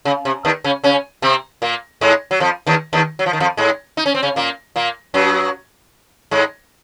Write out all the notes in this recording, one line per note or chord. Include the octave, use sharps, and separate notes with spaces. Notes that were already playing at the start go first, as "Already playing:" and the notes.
C#3
C3
D#2 D#3
C#3 C#4
C#3 C#4
C3 C4
A#2 A#3
G#2 G#3
F#3
F2 F3
D#2 D#3
D#2 D#3
F#3
F3
D#3
F2 F3
G#2 G#3
D#4
C#4
C4
C#3 C#4
A#2 A#3
A#2 A#3
F#2 F#3
G#2 G#3